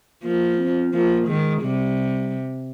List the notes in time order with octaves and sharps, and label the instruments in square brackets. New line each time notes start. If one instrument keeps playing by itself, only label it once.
[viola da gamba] F3 [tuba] A#3
[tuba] C4
[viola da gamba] F3 [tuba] A#3
[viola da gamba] D#3 [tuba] G#3
[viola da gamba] C3 [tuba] G3